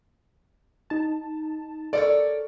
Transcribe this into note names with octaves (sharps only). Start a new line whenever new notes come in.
D#4 A5
A4 A#4 C#5 D5